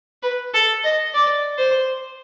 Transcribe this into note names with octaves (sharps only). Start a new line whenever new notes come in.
B4
A4
D#5
D5
C5